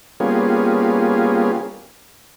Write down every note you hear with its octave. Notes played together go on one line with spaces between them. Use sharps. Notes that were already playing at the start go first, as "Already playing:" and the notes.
G3 A#3 B3 C#4 F4 G#4